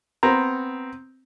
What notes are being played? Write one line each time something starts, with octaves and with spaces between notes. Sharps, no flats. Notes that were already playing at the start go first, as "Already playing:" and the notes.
B3 C4 A#5